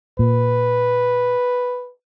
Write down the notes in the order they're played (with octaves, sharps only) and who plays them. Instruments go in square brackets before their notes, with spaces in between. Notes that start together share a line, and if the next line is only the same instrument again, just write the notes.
[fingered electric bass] A#2 [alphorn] B4